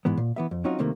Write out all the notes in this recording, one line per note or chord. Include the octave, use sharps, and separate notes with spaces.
G#2 E3 G#3 B3
A#2
E3 B3 E5
F2
F#3 C4 C#4 D#4 F4 F#4
C2 C3 D#3 A3 A#3